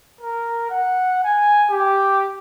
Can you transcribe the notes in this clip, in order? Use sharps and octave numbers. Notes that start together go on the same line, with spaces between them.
A#4
F#5
G#5
G4